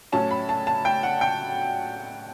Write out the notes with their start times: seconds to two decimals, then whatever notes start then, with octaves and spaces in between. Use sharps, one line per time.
0.12 A2 F#3 C#4 A5
0.31 B5
0.49 A5
0.67 A5
0.85 G5
1.03 F#5
1.21 G5